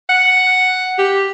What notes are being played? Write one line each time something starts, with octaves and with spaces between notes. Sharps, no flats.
F#5
G4